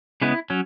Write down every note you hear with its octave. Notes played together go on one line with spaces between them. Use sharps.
C#3 G#3 B3 E4
F#3 C#4